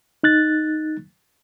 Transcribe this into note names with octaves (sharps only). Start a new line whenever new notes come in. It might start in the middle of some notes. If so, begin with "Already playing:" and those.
D#4 F#6 A6